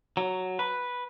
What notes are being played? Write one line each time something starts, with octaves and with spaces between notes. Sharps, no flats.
F#3
B4